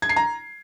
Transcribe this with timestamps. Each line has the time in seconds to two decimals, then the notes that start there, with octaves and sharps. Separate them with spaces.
0.02 G#6
0.09 C7
0.16 A#5